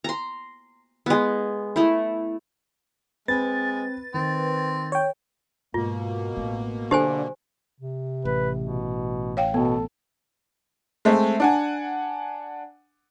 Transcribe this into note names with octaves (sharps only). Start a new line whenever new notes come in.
A#5 C6
G#3 B3
A3 E4
G#3 C4 B4 A6
D#3 C4
C#5 G5
G#2 B2 A#3 F4
A1 A2
D3 F#3 G4 C5 G#5
C3
A1 B4
B2
C#5 F5 G5
B2 B3 A4
G#3 A3 C4
D4 F#5 G#5